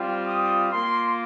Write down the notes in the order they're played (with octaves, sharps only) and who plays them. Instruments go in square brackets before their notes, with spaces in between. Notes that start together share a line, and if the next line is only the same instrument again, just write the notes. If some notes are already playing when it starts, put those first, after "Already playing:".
Already playing: [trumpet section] G3 C4 F4
D#6
A#3 F4 C6